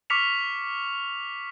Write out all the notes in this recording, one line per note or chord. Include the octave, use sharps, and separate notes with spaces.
C#6 D6 F6 B6 C#7 F7